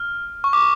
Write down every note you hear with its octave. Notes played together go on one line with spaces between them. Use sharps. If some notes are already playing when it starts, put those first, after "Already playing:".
Already playing: F6
C#6
D6